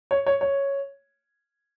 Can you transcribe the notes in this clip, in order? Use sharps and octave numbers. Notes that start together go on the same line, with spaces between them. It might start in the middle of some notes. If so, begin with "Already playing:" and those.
C#5
C#5
C#5